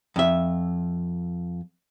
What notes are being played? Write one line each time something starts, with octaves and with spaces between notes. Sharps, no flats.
F2 E5